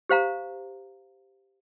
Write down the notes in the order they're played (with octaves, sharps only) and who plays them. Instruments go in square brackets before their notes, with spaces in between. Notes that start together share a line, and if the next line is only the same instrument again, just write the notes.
[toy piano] G4 C5 F5 A#5